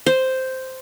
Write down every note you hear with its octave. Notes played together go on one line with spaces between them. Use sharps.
C5